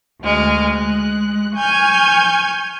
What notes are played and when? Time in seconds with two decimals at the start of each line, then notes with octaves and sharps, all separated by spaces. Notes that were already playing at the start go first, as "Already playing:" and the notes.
0.22 D2 G#3 F6
0.76 G#3 F#6
1.55 G#5 C#6 F6 G6 G#6